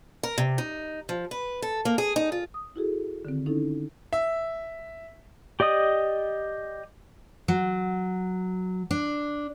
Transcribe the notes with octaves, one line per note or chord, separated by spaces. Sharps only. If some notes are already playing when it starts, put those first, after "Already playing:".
A#4
C3
D#4
F3
B4
A4
A#3
G#4
D#4
F4
D#6
E4 F#4 G#4 A4
D3 D#3 C4
C#4 D#4 E4 A4
E5
G4 D5 D#5 D#6
F#3
D4